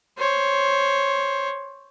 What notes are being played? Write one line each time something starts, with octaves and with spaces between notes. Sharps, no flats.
C5 C#5